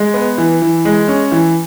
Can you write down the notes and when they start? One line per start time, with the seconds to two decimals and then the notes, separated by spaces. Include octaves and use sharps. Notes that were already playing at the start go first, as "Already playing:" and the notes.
Already playing: G#3
0.14 B3
0.38 E3
0.62 E3
0.85 G#3
1.08 C#4
1.32 E3